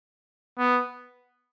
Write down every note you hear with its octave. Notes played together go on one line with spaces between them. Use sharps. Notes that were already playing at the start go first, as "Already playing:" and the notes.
B3